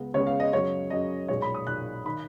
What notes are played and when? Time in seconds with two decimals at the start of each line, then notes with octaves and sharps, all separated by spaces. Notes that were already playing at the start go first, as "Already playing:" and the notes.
Already playing: C#2 C#3 G#3 B3
0.14 C#2 C#3 G#3 B3 C#5
0.27 F5
0.40 D#5
0.52 F#2 C#3 F#3 C#5
0.90 F#2 C#3 F#3 D#5
1.28 B1 A#2 G#3 C#5
1.42 B5
1.54 D#6
1.67 B1 A#2 G#3 F#6
2.06 D#3 B5